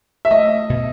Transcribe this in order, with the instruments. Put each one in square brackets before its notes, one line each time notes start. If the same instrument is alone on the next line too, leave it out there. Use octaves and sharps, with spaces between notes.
[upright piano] E5
[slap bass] A3 [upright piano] D#5
[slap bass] B2